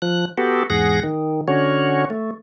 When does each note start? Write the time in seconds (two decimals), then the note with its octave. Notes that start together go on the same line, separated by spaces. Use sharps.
0.02 F3 F#6
0.38 B3 F#4 G4 A4
0.70 E2 G#2 G#4 F#5 A#6
1.03 D#3
1.48 D3 C#4 F#4 C#5
2.10 A3